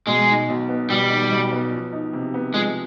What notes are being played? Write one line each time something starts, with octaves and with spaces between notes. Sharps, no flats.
B2 G#3
D#4
B1
B3
B2 G3
D#4
B1
B3
F3
D#4
C3
B3
F3 G#3